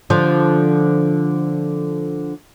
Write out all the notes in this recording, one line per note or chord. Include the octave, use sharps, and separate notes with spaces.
D3 F3